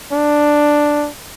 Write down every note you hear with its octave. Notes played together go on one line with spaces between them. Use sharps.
D4